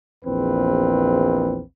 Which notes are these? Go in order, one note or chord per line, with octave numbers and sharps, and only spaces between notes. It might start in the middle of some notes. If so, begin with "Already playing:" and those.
A#1 E2 C4 B4